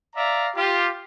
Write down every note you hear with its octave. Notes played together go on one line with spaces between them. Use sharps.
D5 E5 F5 A#5
F4 G4